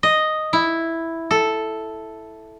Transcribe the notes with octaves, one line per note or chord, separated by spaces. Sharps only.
D#5
E4
A4